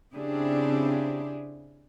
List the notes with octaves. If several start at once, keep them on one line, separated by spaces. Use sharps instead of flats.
C#3 C4 D4 E4 G4 G#4